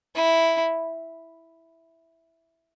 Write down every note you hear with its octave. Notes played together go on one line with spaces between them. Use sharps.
E4